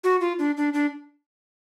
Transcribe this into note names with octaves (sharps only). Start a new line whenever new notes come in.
F#4
F4
D4
D4
D4